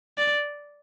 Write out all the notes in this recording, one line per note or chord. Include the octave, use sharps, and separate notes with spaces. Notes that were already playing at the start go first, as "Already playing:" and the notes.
D5